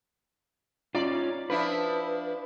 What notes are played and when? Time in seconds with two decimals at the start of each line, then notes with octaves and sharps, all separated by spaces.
0.95 C#4 D#4 F4 D5
1.50 F3 D4 E4 B4